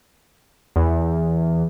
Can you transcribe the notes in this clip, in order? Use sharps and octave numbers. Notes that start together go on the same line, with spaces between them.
E2